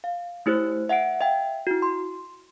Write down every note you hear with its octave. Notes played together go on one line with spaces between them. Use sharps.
F5
A3 E4 G4 C5 F#6
E5 F#5 C7 D7
E5 F5 G5
E4 F#4
C6